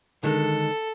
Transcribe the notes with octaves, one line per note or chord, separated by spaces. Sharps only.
D3 D#3 G#3 A4